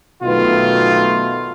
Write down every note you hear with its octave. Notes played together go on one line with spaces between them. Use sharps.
B1 B2 D#3 A3 B3 F4